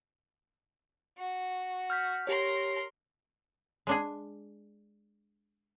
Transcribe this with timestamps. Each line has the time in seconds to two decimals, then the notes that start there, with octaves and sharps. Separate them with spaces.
1.18 F#4
1.90 F6 G6 B6
2.27 G4 A#4 C#5 C6
3.87 G#3 D4 G#4